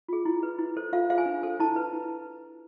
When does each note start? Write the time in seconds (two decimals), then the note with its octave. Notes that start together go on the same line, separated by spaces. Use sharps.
0.08 F4 G#4
0.25 E4
0.43 B4
0.59 E4
0.77 A4 C5
0.92 F4 F5
1.10 G#4 C5 F5
1.18 G#5
1.26 D4
1.43 A4 C5
1.60 E4 A5
1.76 B4
1.93 E4